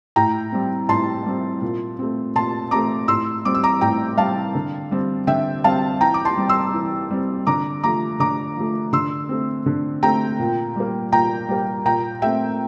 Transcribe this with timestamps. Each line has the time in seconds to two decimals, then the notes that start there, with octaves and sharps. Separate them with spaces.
0.16 A2 G5 A#5
0.52 G3 C4
0.89 A2 A5 C6
1.26 G3 C4
1.62 A#2
1.99 A3 C4
2.36 A#2 A5 C6
2.71 A3 C4 A#5 D6
3.08 A2 C6 E6
3.45 G3 C4 D6
3.54 E6
3.64 A#5 D6
3.81 A2 G5 A#5
4.17 G3 C4 F5 A5
4.55 D3
4.91 G3 C4
5.27 D3 E5 G5
5.64 G3 C4 F5 A5
6.01 E3 G5 A#5
6.14 D6
6.25 A5 C6
6.38 G3 C4
6.49 C6 E6
6.74 E3
7.10 G3 C4
7.47 D3 A#5 D6
7.83 F3 A3 A#5 D6
8.20 D3 A#5 D6
8.57 F3 A3
8.93 D3 C6 E6
9.29 A3 C4
9.66 D3
10.03 A3 C4 G5 A#5
10.39 A#2
10.76 G3 A#3
11.12 A#2 G5 A#5
11.48 G3 A#3
11.85 A#2 G5 A#5
12.22 A3 C4 E5 G5